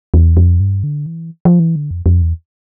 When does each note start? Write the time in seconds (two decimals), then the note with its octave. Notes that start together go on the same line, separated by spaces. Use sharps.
0.14 E2
0.37 F2
0.60 G2
0.83 D3
1.06 E3
1.45 F3
1.60 E3
1.76 D3
1.91 F2
2.06 F2
2.22 E2